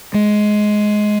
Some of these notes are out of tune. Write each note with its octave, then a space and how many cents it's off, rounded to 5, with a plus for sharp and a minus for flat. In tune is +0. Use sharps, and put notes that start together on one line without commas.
G#3 +15